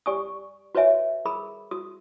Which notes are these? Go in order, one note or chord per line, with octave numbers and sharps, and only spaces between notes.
G4 D5 G#5 C#6 D#6
F#4 B4 C#5 D#5 E5 G#5
G#4 A#4 B5 D#6
F#4 D#6